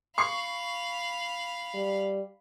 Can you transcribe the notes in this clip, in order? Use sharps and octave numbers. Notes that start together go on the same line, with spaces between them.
F5 B5 C#6 C7
G3